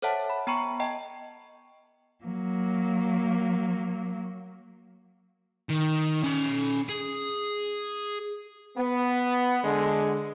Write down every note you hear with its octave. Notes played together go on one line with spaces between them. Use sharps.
A4 C5 C#5 E5 F#5 A5
B5
B3 G5 A#5 B5 C#6 C#7
D#5 G5 A5
F#3 A#3
D#3
C#4 B5
G#4
B3
D3 G#3